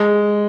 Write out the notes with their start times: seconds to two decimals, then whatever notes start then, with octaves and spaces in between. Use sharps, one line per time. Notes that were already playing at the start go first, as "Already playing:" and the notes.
Already playing: G#3